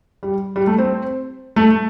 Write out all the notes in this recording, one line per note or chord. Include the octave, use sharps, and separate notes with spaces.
G3
G3
A3
C4
A3